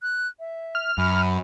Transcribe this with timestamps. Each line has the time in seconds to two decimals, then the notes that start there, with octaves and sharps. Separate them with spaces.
0.02 F#6
0.40 E5
0.75 F6
0.98 F#2 B5